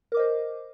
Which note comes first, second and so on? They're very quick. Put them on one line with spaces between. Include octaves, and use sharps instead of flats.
A#4 D6 D#5 C5